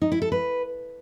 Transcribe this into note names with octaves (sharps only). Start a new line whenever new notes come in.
D#4
E4
A4
B4